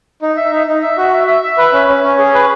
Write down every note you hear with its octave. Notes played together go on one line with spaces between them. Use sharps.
D#4
E5
D#4
D#4
E5
F#4
E5
E5
E5
B4
C#4
C#4
C#4
G#4
B4